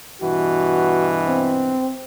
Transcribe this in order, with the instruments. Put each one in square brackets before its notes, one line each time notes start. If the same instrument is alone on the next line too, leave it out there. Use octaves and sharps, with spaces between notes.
[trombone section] G2 B2 E3 [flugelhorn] F#4
[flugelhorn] C4